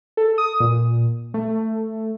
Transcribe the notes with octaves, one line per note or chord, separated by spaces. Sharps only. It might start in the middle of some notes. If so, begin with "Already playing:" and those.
A4
D#6
A#2
A3